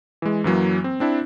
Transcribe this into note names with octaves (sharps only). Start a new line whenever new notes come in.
E3 G#3
F#2 E3 F#3 A#3
C4
C4 D4 E4